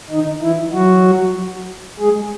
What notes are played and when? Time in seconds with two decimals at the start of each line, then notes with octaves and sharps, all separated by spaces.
0.10 D#3 D#4
0.42 E3 E4
0.73 F#3 F#4
1.99 G#3 G#4